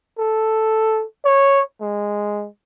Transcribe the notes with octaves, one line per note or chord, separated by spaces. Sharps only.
A4
C#5
G#3